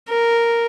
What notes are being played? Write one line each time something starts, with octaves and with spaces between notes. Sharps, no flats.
A#4